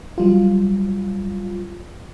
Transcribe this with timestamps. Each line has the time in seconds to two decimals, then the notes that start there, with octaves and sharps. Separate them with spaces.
0.18 F#3 G3 F4